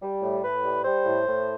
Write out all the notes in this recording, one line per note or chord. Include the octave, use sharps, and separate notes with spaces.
G3
A2
A2 B4
G3
G3 C5
A2
A2